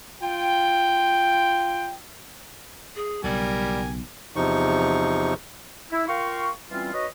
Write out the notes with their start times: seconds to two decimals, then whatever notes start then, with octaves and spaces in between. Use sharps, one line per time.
0.22 F4 G5
2.96 G#4
3.24 B1 C#3 G3 G4 A#4 G#5
4.36 E2 C3 F3 D#4 C#6
5.92 E4
6.08 F4 A#4 F5 G5 C6 C#6
6.71 E3 G3 C4 C#4 F4
6.93 D#4 F#4 B4 C#5 D#5